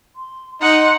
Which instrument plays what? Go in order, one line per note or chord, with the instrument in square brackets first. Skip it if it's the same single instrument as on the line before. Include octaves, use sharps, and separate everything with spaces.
[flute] C6
[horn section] D#4 [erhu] F#5 [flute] C6